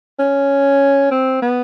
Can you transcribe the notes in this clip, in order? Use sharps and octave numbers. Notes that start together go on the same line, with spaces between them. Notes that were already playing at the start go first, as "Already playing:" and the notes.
C#4
C4
B3